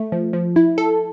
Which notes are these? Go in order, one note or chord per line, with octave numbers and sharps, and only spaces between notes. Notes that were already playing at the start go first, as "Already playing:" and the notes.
Already playing: A3
F3
F3
E4
A4